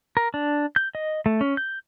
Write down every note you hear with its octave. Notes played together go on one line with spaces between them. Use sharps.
A#4
D4
G6
D#5
A3
C#4
G6